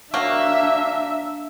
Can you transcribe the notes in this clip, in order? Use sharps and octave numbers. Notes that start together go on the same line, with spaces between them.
F#3 A#3 D4 E5